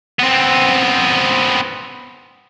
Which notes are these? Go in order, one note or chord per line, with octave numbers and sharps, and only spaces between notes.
B3 C4